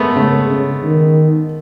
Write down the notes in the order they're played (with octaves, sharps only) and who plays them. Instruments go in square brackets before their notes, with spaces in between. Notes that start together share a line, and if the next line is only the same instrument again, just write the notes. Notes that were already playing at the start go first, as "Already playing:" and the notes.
Already playing: [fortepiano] G#3 A3 B3
[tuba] C#3 [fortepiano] A3
[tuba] C#3
D#3